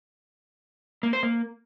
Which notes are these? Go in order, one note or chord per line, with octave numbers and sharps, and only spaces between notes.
A#3
C5
A#3